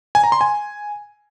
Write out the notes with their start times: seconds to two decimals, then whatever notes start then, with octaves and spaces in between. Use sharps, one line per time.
0.15 G#5
0.24 A#5
0.32 C6
0.41 G#5